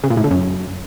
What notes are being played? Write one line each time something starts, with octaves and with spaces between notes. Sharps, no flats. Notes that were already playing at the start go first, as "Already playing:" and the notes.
C#3
A#2
A2
D3
F#2